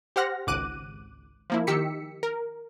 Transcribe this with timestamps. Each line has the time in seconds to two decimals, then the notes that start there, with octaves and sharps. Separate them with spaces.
0.16 G4 C5 F#5 F6 A#6
0.47 G#1 C#2 D6 F#6 D#7
1.50 F3 A#3 E4
1.67 D#3 G4 E6 B6 C#7
2.23 A#4